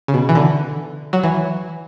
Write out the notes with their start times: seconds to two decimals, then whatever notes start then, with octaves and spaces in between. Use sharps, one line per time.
0.08 C#3
0.14 B2
0.29 E3
0.35 D3
1.13 F#3
1.23 E3